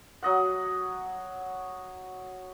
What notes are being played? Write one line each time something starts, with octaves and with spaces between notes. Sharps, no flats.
F#3 D#5 F#5